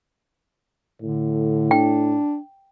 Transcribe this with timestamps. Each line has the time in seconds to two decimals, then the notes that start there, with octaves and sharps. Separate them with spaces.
1.02 A2 D3
1.71 D4 G5